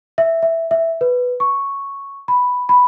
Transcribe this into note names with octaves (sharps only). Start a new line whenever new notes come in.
E5
E5
E5
B4
C#6
B5
B5